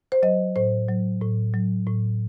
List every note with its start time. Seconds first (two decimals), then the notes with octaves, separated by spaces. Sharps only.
0.12 C5
0.23 F#3 D#5
0.56 A2 C5
0.89 F#3
1.21 A2
1.54 F#3
1.87 A2